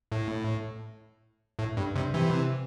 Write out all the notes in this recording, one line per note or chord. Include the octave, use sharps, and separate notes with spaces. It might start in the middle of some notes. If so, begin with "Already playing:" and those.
A2
A2
G2
G2 C3
C3 E3